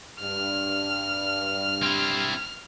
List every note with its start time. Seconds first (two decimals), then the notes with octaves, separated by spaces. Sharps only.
0.21 G2 F6
1.83 C4 E4